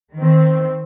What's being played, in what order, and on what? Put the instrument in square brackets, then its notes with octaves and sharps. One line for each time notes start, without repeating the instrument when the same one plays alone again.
[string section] D#3 C4